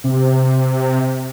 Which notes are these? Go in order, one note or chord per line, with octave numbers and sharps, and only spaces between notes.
C3